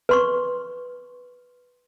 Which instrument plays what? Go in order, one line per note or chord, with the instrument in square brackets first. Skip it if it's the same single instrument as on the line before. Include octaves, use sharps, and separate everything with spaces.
[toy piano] B4 C6 C#6